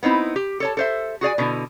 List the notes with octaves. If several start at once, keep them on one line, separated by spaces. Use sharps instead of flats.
B3 C4 D#4 E4
G4
A4 C#5 A5
A4 C5 E5
F#4 G#4 D5 G#5
B2 D3 E4